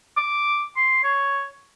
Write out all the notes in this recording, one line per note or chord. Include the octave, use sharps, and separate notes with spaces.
D6
C6
C#5